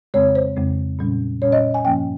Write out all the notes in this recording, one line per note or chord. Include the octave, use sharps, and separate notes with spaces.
F2 C#3 G#3 C4 C#5
C5
F2 C#3 G#3 C4
A#2 G3 C#4
A#2 G3 C#4 C#5
D#5
G#5
G2 F3 A#3 C#4 G5